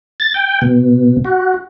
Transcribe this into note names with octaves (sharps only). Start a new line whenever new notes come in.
A6
G5
B2
F#4